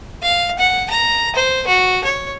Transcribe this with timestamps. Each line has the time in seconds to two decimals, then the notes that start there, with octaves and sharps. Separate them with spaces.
0.23 F5
0.59 F#5
0.90 A#5
1.35 C5
1.67 F#4
2.04 C#5